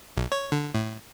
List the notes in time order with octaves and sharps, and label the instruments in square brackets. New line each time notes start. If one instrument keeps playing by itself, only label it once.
[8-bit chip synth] B1
C#5
D3
A2